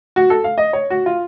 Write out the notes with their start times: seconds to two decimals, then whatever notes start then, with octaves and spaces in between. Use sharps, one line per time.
0.16 F#4
0.30 A4
0.44 F5
0.58 D#5
0.73 C#5
0.90 F#4
1.06 F4